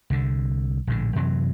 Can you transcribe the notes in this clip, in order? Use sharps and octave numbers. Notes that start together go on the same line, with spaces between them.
C2 D3
A#1 A2 D3
F#2 C3 E3 F#3